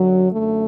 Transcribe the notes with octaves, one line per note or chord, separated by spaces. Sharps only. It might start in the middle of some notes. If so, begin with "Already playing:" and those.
Already playing: F#2 D3 F#3
F#2 D3 A3